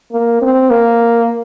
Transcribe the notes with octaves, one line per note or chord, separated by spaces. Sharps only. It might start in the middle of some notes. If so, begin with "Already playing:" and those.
A#3
C4
A#3